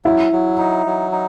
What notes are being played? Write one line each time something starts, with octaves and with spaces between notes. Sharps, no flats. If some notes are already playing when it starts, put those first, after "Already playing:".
F#3 E4
F#3
D#4
F#3
D#4